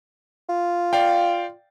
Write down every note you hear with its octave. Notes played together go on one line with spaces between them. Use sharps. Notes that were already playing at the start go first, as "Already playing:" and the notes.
F4
D5 F5 G5